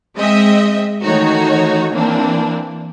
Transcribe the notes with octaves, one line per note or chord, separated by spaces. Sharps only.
G#3 C4 D#5 E5
D#3 E3 A3 D#4 F#4 C#5
E3 A#3 C4 D4